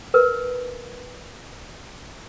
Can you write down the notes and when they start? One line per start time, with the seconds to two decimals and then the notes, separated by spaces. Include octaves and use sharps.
0.14 A#4 B4